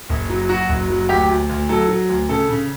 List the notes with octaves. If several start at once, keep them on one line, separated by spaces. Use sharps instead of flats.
F#1
F#3
F#3 F#4
F#1
F#3
D2 G4
D2
D2
F#3 A4
F#3
D2
C#3 A4
C#3